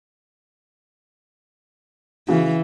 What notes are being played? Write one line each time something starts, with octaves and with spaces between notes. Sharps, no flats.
C#3 E3 F#4